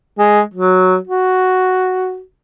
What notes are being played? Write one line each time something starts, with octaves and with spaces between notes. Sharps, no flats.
G#3
F#3
F#4